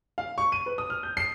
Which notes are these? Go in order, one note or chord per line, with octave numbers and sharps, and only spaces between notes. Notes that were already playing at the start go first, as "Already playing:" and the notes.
F5
C#6
D#7
B4
D#6
F6
G6
C7